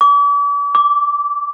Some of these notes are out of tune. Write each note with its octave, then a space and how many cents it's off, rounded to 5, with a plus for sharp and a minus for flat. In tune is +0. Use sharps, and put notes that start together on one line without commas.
D6 -40
D6 -15